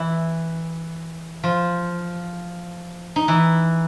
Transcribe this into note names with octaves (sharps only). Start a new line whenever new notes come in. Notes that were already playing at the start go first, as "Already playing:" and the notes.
Already playing: E3 E4
F3 F4
D#4
E3 E4